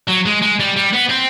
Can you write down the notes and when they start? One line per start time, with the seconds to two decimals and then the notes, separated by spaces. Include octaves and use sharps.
0.09 F#3
0.26 G#3
0.42 G#3
0.60 G3
0.76 G3
0.93 B3
1.09 C4